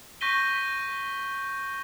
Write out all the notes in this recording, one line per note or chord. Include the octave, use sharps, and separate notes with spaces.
C#6 G6 A#6 B6 D#7 G7